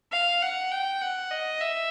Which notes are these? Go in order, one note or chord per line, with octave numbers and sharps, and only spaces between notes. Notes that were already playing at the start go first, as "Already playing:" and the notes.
F5
F#5
G5
F#5
D#5
E5